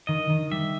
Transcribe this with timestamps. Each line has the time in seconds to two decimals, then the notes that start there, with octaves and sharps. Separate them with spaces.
0.07 D#3 D#5
0.30 D#3
0.51 G3 E5